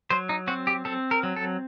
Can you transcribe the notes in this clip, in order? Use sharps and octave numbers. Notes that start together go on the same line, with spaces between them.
F#3 C5
D#4
C4 F#4
G4
C4 A4
A#4
F#3
A4